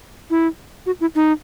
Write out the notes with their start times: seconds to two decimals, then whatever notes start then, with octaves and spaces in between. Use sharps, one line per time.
0.30 E4
0.86 F#4
1.01 E4
1.15 D#4